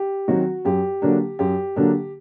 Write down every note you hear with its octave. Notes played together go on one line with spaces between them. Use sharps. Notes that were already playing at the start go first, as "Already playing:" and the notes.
Already playing: G4
D#3 F#3 C4 F#4
F#2 G4
D3 F#3 A#3 D4
F#2 G4
D3 F#3 A#3 D4